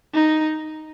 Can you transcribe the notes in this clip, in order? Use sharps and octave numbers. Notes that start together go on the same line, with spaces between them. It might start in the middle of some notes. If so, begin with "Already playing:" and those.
D#4